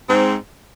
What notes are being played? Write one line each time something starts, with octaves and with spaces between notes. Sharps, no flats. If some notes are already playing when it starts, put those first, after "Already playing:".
G#2 C4